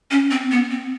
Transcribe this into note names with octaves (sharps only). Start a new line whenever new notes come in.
C#4
C4
B3
C4